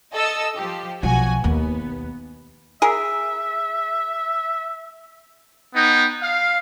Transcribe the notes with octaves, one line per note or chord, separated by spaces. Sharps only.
A4 D#5 E6
F3 G4
B1 F3 F#4 G#5
D#2 A#3 B3
G#4 A#4 E5
B3 D#4 G5
F5